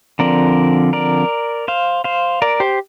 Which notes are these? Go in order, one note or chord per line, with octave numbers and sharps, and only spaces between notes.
D3 F3 C4 A#4 D5
A#4 D5
C5 F5
C5 F5
A#4 D5
G4 C5